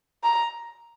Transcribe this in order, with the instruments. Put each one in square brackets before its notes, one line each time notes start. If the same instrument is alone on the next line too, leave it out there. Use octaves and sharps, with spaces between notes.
[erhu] A#5